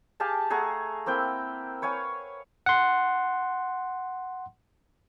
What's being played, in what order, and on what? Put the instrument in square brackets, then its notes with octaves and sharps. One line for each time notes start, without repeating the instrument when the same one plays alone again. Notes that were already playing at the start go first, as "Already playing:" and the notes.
[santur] G4 G#4 F5 A5
A3 G#4 F#5 A#5
A#3 C4 E4 G5
B4 C#5 F5 G#5
[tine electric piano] F#5 C6